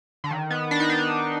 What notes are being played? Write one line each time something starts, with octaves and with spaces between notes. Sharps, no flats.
D3
D#3
B3
D4
D#4
D4